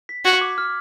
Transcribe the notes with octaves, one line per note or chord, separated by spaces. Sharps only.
B6
F#4 G#6
D6
F6